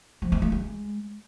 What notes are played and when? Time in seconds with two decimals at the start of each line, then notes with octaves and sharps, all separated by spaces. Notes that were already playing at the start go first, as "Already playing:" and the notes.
0.22 F3
0.32 C4
0.42 A3
0.52 G#3